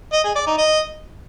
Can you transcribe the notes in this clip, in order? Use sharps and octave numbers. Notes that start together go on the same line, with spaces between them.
D#5
G#4
D5
D#4
D#5